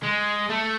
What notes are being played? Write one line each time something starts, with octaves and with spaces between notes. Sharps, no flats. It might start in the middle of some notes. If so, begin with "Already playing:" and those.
G#3
A3